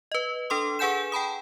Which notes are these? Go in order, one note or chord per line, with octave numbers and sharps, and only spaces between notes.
B4 D#5
D4 A4 C6 D#6
G#4 B4 F#5 G#5 G6 E7
G5 A5 B5 D#6